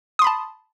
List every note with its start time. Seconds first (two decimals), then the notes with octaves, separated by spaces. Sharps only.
0.19 D#6
0.22 C6
0.24 B5
0.27 A5